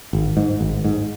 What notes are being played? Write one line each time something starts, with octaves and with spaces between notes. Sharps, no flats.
G#1
G#2
G#1
G#2